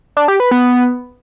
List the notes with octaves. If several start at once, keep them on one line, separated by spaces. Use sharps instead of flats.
D4
G4
B4
B3